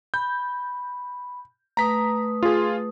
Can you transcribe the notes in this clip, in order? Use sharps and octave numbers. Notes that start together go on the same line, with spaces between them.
B5 G6
A3 B4 A#5 D#6 B6
F4 G#4